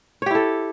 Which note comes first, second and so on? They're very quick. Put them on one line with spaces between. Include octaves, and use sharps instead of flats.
C#5 G4 E4 A4